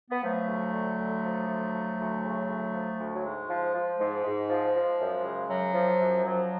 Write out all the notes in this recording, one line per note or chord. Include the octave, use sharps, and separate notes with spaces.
B3
F3 F#3 A3
D2
D3
D2
F3
D2
F3
D2
C#3
D2
F3
D2
F#3
G#2 G#3
F3
F3
G#2 G#3
G#2
F3
F3
F#2
C#3
F#2 F#3
F3
F#2
F3 F#3